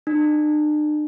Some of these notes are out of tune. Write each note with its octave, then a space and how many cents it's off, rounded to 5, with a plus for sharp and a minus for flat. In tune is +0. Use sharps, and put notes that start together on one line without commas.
D4 +45